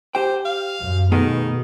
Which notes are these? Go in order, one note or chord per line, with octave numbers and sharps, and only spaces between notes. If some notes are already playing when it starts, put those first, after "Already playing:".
G4 C5 G5
F5
F#2
B2 D#3 A3 B3 G#4